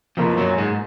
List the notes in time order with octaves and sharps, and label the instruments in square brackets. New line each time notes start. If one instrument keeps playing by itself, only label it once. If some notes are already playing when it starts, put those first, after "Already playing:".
[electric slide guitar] F2 F3 [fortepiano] B2 A#3 F4
[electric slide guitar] F#2 F#3
G#2 G#3